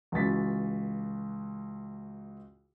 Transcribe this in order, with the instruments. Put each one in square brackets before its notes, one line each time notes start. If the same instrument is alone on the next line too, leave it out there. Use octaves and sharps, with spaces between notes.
[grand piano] C#2 E3 F#4 A6 B6